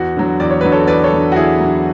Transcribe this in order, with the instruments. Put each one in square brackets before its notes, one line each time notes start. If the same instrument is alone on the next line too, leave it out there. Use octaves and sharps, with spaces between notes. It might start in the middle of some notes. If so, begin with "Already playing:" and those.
Already playing: [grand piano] E2 F#4
D3 F#3
E2 D5
C#5
D3 F#3 B4
A4 C#5
E2 B4 D5
A4 C#5
D3 F#3
F#4
E2 E4 G#4
D3 F#3